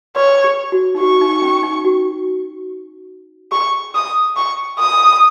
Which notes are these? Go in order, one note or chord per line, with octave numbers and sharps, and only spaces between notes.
B4 C#5
G#4
F#4
D#4
F#4 C#6
D#4
C#4
D#4
F#4
G#4 C#6
D#6
C#6
D#6